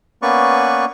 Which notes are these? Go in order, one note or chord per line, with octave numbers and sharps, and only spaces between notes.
A#3 B3 C#4 B4 D5 C#6